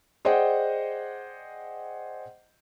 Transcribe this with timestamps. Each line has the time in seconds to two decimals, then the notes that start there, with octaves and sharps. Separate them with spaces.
0.25 G#4 C5 D5 D#5 F#5 G5